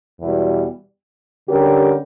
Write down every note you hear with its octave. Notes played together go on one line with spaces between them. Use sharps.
E2 B2 G3
D3 G3 C#4 G4 A#4